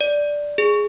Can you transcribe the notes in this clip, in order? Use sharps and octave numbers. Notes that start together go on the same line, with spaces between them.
D5
G#4